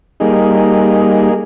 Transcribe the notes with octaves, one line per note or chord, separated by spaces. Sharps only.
G3 A#3 D#4 G#4